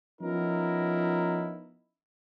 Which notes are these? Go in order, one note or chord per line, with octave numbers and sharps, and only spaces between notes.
F3 B3 C#4 D#4 E4 A#4